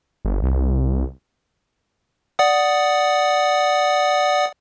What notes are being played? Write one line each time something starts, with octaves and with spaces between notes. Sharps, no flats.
G1
C2
D5 F#5 D#6